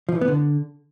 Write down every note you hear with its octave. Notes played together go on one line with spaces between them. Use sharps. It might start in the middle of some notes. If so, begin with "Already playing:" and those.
F3
E3
B3
D3